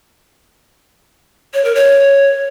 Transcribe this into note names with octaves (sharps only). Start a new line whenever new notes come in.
C#5
A#4
C#5